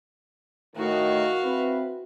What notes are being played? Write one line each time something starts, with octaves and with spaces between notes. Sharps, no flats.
A2 D#3 F#4 F5
C4 E4 B4